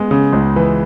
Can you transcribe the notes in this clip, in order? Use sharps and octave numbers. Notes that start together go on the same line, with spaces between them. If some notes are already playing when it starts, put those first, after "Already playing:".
Already playing: G#3 B3
C#3
C#2
E3